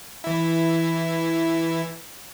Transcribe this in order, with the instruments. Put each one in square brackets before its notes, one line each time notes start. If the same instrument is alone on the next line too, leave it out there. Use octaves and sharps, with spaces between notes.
[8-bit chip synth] E3 E4